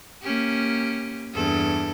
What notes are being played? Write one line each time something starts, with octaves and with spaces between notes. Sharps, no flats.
A#3 C#4 G4
E2 G2 A4